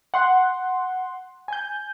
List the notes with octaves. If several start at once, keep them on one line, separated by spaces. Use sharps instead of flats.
F#5 C6
G#5 G6